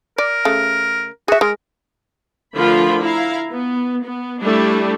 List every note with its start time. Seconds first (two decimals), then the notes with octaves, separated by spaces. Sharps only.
0.18 A#4 D5
0.45 C#3 A3
1.28 F#4 G#4 E5
1.41 G#3 A#4
2.56 D3 F3 A3 F4 A#4 B5
3.02 E4 F5 A#5
3.52 B3
4.04 B3
4.42 G3 A3 D4 E4 G4 A4